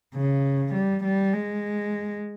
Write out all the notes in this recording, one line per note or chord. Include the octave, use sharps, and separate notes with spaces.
C#3
G3
G3
G#3